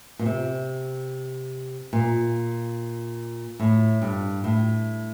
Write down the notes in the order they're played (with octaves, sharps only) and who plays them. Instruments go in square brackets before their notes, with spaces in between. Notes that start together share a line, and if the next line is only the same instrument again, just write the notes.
[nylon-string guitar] A#2
C3
A#2
A2
G2
A2